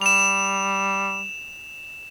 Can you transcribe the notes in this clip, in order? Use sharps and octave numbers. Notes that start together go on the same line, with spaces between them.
G3 E7 F7